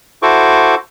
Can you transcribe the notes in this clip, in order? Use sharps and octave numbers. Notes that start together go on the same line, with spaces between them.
E4 F#4 A4 C5 C#6 D6